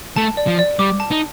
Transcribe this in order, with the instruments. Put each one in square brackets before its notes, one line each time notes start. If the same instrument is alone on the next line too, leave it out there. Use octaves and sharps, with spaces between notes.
[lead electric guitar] A3 [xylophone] A5
[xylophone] D5
[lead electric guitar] F3
[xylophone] D5
[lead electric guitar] G3 [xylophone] D6
[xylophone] A5
[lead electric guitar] D#4